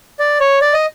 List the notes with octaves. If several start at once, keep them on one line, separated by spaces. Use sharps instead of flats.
D5
C#5
D5
D#5